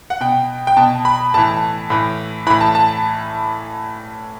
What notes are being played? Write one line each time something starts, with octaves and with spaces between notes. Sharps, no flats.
F#5
B2 G5
G5
B2 A5
B5
A2 E3 A5
A2 E3
A2 E3 B5
A5
A5